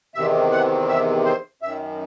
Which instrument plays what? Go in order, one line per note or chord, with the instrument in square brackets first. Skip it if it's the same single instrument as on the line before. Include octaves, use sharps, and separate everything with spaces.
[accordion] E2 C3 D#3 E5
F#5
E5
C5
F#2 D#3 E5